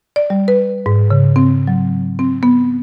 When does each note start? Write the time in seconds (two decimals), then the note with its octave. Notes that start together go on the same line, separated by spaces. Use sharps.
0.16 D5
0.30 G3
0.48 B4
0.86 G#2
1.10 C#3
1.36 C4
1.67 F#3
2.19 C4
2.43 B3